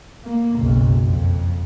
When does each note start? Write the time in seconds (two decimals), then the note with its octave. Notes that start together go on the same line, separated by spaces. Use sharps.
0.24 A#3
0.59 F#1 B1
1.06 F2 F3